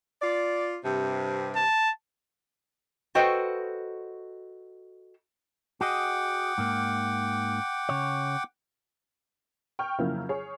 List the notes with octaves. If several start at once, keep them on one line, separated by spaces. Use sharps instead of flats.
F4 D5
G2 C3
A5
F#4 A4 B4 C5 D#5 G5
F#4 G#4 D#5 F#5 G5 D6
G#2 A#3
C#3 C#5
G5 C#6 F6 G6
F2 C#3 F#3 A#3 E4
G#4 C#5